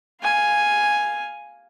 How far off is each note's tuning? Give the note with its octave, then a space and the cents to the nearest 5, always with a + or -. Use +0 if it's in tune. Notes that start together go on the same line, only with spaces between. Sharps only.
F5 +0 G#5 +0